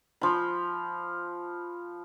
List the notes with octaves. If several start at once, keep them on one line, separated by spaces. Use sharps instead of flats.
F3 B5